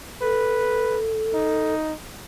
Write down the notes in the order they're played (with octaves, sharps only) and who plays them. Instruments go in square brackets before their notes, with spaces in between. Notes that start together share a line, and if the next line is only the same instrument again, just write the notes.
[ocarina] A4 [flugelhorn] B4
[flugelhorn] D#4